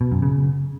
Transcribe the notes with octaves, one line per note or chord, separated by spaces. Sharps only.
B2
F#2
C#3